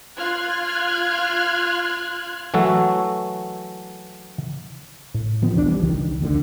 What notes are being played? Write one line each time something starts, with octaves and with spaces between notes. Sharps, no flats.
F4 F6 F#6 G#6
E3 F#3 A3 F#4 A4
A2
D#3 F3 B3
B1 E2 E3 D4
E3 G3
C#2 D#3 E3
F1 D2 B2 D3